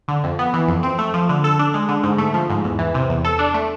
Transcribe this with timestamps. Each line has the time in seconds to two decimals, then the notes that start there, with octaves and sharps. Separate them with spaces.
0.08 D3
0.24 F2
0.39 B3
0.53 E3
0.68 F2
0.83 C4
0.99 A3
1.14 F3
1.29 D3
1.44 A4
1.59 D4
1.74 G#3
1.89 D3
2.03 G#2
2.18 A3
2.34 F3
2.50 G#2
2.64 E2
2.79 E3
2.94 C3
3.10 E2
3.25 A4
3.39 D4
3.54 A3